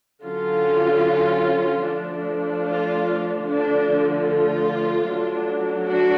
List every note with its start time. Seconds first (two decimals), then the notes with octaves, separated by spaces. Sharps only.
0.24 D3 F#3 C#4 F4
1.85 F3 A3 D4
2.65 F4
3.45 D3 F3 A3 D4
4.26 F4
5.06 F#3 A3 D4
5.87 D4 F#4